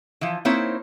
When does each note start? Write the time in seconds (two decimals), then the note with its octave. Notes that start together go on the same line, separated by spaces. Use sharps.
0.21 E3 F3
0.45 A#3 C4 D#4 E4 C5 C#5